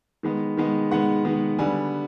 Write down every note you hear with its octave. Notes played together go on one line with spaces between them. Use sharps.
D#3 G#3 B3
D#3 G#3 B3
D#3 G#3 B3 F#5
D#3 G#3 B3
D3 G3 B3 G#5